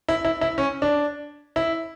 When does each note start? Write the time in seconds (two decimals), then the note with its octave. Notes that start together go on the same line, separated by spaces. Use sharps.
0.08 E4
0.25 E4
0.41 E4
0.58 C#4
0.82 D4
1.56 E4